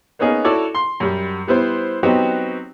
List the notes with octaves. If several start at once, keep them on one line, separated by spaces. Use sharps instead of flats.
A#3 B3 C#4 D#4 G#4
E4 F#4 A4 C#5 D5
C6
F#2 G3
G3 B3 E4 C5
F#3 B3 C4 D#4 F#4 G4